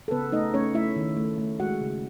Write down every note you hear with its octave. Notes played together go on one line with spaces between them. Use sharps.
A4
C#3 B3 B4
A3 D#4 D#5
A3 C#4 C#5
A3 E4 E5
D#3
A3
A3
G#3 F#4 F#5
C#3